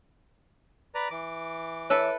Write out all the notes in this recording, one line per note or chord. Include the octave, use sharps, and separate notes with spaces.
B4 D5 A#5
E3 D6
E4 A4 B4 C#5